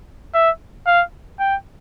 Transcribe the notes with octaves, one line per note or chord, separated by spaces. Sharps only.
E5
F5
G5